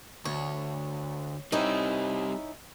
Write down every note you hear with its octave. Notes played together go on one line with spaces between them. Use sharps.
D2 C#5
G3 C4 C#4 D#4 E4